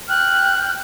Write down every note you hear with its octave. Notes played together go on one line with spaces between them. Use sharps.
G5 F6 F#6